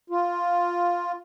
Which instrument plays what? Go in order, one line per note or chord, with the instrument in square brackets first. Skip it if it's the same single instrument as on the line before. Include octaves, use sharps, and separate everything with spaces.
[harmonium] F4